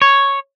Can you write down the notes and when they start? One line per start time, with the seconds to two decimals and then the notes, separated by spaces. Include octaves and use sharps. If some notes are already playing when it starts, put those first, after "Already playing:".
0.02 C#5